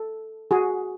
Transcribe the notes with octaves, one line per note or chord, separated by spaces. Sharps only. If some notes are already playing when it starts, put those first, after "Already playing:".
Already playing: A4
F#4 G#4